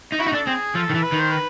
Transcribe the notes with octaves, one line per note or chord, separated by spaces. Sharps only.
D#4
E4 F#4
D#4
D4 A4
C4 G#4
F3 A4
D#3
E3
B4
D#3
C5
B4